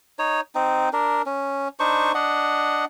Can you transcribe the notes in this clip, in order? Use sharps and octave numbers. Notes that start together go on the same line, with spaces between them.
D#4 C#5
C4 D#4
D4 A#4
C#4
D4 D#4 C5 C#6
D4 D#5 F#5